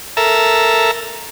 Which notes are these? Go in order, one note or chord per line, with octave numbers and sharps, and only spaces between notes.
A4 A#4 E5